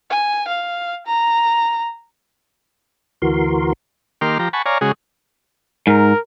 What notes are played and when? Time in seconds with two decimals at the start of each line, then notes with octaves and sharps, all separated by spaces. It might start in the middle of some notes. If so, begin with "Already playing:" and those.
0.10 G#5
0.48 F5
1.07 A#5
3.22 D2 E3 F#4 A#4 C6
4.21 D#3 A#3 G4 C6 D6 F6
4.39 F3 G4 A#5
4.53 F#5 G#5 A5 B5 C#6
4.66 C#5 D5 F5 G#5 A#5
4.81 C#3 G#3 F#4 G#4
5.87 G#2 A#4